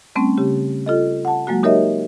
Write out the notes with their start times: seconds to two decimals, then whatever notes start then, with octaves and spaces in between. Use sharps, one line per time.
0.16 G3 A3 C4 C#4
0.38 C#3 G4
0.86 F4 A4 D#5
1.25 F#5 A5
1.47 F#3 G#3 A#3 F#4
1.63 D#4 G4 A#4 C#5 D#5 E5